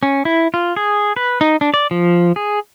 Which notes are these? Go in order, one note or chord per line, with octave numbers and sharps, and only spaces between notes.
C#4
E4
F4
G#4
B4
D#4
D4
D5
F3
G#4